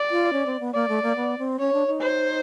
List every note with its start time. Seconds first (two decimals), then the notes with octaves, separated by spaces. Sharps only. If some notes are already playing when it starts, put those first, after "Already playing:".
Already playing: D5
0.11 F4
0.33 C#4
0.46 C4
0.60 B3
0.74 A#3 D5
0.89 A3
1.03 A#3
1.16 B3
1.38 C4
1.59 C#4 C#5
1.73 D4
1.87 D#4
2.01 C5